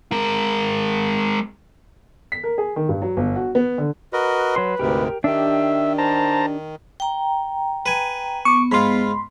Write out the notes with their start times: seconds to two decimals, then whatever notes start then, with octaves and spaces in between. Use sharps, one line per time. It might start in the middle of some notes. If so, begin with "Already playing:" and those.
0.12 G#3 A#4
2.32 B6
2.43 A#4
2.58 G#4
2.76 D#3
2.89 G2
3.02 F#3
3.17 G1
3.36 F#4
3.55 B3
3.78 D3
4.13 F#4 A#4 B4 D#5
4.56 F#3 C6
4.79 D2 G#2 C3 G4 A#4
5.24 D#3 D4 G4 E5
5.98 C5 A5 A#5
7.00 G5 A#5
7.86 B4 G#5
8.45 B3 C#6 D6
8.72 G#2 F4 B5 C6